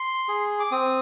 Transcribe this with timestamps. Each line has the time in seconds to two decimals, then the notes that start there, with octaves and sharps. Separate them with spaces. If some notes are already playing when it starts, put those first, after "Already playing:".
Already playing: C6
0.28 G#4
0.60 D6
0.71 C4 D#6